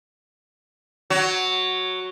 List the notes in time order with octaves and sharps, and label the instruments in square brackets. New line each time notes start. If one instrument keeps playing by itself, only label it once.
[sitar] F#3